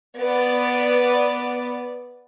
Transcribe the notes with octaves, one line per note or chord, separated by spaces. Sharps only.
B3 D5